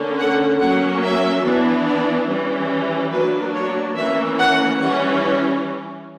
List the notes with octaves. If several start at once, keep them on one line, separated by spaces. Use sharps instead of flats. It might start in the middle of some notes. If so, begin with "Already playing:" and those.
Already playing: D3 A#3 C#4
F#5
F#3 A#3 C#4 F#5
E5
E3 B3 D4
D5
E3 G3 C#4
F#3 A#3 D4 B4
C#5
E3 A#3 C#4 E5
F#5
E3 G3 C#4 F#5